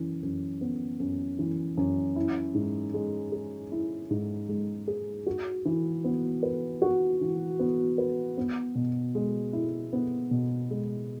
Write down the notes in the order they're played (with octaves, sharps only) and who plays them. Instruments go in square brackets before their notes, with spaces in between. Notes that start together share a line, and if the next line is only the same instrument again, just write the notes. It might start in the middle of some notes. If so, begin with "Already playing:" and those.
Already playing: [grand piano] F#2 E3
F#2
B3
F#2
E3
F#2
E4
G#2
G#3
G#4
E4
G#2
G#3
G#4
F#4
E3
B3
B4
F#4
E3
B3
B4
B3
B2
G#3
E4
B3
B2
G#3